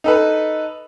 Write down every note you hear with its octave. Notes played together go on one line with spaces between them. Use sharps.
D#4 A4 B4